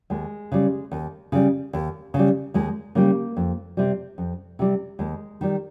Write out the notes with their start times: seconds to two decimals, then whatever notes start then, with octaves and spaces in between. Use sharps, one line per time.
0.10 D#2 G#3
0.52 C#3 G3
0.91 D#2
1.32 C#3 G3
1.73 D#2
2.14 C#3
2.19 G3
2.54 D#2 G#3
2.95 C#3 G3 A#3
3.37 F2
3.77 C3 G3
4.18 F2
4.59 C3 G3
4.99 D#2 G#3
5.41 D#3 G3